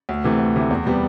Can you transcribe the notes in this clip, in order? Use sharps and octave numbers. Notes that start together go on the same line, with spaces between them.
D2
C3 E3 A3
D2
C3 E3 A3
E2
C3 G3 B3